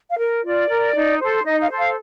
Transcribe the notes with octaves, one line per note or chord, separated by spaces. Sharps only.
F5
A#4
F4 D5
A#4
D#4
A4 C5
D#4 D#5
F5
A4 C5
F5